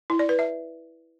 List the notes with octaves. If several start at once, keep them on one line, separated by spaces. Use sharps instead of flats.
E4
D5
B4
E5